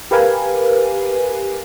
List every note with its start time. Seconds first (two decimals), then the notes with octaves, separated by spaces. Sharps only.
0.11 G4 A#4 B4 F5 G#5